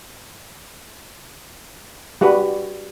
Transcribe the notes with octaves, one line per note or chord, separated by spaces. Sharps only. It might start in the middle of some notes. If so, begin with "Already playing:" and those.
G3 F#4 B4